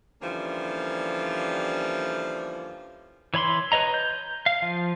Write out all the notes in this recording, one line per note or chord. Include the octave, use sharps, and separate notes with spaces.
D3 E3 F3 G3 A#3 C#4
E3 C#5 B5 C6
B4 C#5 D#5 A#5
G6
F5
F3